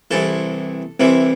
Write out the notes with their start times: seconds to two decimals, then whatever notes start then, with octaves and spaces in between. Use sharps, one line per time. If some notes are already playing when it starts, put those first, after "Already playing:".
0.11 C2 C3 E3 A4
1.00 C2 C3 E3